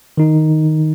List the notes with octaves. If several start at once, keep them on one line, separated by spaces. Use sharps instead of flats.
D#3 D#4